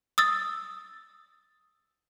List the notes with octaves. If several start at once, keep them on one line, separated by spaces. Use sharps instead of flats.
D#6 E6 A6